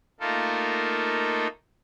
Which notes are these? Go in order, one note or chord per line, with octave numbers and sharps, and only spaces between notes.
A3 A#3 D#4 F4 A4 A#4